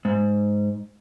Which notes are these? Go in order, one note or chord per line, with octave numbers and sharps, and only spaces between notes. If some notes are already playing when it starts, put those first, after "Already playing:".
G#2